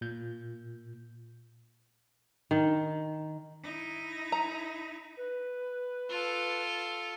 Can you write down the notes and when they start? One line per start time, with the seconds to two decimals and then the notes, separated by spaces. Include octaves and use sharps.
0.01 A#2 G6
2.51 D#3
3.63 D#4 E4
4.32 A#5
5.17 B4
6.09 F4 A4